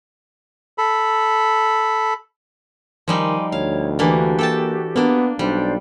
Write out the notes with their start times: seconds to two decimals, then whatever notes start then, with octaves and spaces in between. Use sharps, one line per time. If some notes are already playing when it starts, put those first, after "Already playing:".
0.78 A4 B5
3.08 D#3 F3 G3 D#4 G#5 C6 D6
3.52 D2 C#5 F5
3.99 E3 A#3 D4 F#4 G4
4.39 A#3 A4 G5 A5
4.96 A#3 B3 D4
5.39 B1 G3 D4 C5 D5